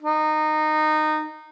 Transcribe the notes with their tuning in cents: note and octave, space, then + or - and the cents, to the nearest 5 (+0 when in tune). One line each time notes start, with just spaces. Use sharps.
D#4 -20